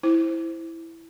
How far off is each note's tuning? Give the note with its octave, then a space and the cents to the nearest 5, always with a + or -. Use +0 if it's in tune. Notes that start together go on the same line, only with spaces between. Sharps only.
E4 +0 C5 +5